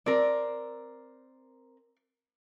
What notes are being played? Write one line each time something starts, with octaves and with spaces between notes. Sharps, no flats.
C4 A#4 D5